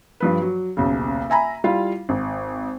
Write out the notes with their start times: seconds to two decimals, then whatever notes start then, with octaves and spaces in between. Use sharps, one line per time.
0.20 G2 F3 B4
0.42 F#3
0.77 D#1 B1 C#3
1.30 E5 G#5 A#5 B5
1.64 G3 E4 F4 F5
2.09 G#1